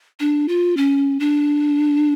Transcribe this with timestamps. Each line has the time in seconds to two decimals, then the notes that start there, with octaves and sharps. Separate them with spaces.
0.20 D4
0.48 F4
0.77 C#4
1.20 D4